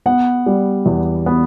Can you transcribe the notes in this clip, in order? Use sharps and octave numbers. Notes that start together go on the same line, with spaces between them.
B3 F#5
G3
E2
B3